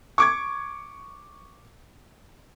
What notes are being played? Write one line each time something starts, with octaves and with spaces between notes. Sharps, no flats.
C#6 D6 G#6